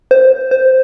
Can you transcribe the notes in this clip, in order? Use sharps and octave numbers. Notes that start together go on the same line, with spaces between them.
C5
C5